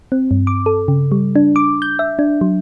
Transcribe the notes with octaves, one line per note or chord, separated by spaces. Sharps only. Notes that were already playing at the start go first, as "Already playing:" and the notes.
C4
G2
D6
A4
C#3
G3
D4
D6
G6
E5
D4
F#3